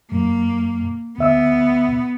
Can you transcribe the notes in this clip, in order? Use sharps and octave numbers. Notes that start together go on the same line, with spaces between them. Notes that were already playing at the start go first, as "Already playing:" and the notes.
F#2 A#3
D2 B3 E5 E6